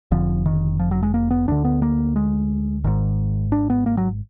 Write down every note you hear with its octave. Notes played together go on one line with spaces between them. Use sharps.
F1 F2 D3 F3
D#3
F3
F#3
G#3
A#3
B3
D2 D3 D4
B3
A#3
G#3
G#1 G#2 D#3
D4
B3
A#3
F#3